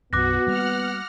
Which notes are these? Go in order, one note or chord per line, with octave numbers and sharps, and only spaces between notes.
B1 F#2 B3 F#4 D6 F#6 A#6
G3 A#3 F#5 F6